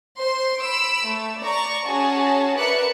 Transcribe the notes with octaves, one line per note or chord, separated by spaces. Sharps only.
C5 C6 C7
B5 E6 D7
A3
D5 A#5 C#6
C#4 F#4 G#4 A5
A#4 B4 D5 E5 F#6 C#7